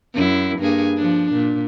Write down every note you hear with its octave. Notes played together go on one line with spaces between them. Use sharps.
F#2 E4
G2 A#3 G#4
F3 D4
A#2